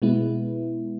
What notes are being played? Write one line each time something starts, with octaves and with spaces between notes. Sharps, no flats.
B2 G#3 B3 E4